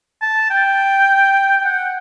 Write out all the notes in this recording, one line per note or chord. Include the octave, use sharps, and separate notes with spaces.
A5
G5
G5
F#5